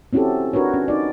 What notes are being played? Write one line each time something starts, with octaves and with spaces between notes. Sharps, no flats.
C4 C#4 E4 F#4 G4 A4
D4 F#4 A#4 B4 C#5
C#4
D#4 D5